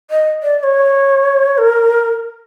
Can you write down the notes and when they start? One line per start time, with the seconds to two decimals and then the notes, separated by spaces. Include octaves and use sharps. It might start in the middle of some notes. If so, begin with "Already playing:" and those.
0.11 D#5
0.43 D5
0.59 D5
0.63 C#5
1.58 A#4